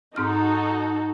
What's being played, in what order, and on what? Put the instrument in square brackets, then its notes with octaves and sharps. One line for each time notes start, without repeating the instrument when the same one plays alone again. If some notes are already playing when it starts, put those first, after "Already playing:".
[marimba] G#2 C4 F6 [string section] D#4 F#4 A4